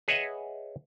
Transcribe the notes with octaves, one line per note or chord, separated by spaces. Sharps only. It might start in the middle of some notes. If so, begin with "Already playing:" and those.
G#4 B4 C#5 D#5 E5 F#5